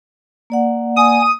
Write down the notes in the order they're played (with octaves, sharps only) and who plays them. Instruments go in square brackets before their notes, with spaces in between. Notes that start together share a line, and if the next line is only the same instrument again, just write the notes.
[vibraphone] A#3 D5 F#5
[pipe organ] G#5 [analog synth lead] D#6